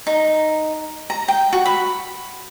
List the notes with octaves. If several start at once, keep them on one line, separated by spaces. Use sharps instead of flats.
D#4
A#5
G5
F#4
B5